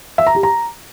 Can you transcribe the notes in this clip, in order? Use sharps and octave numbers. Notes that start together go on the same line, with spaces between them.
E5
A#5
G4
A#5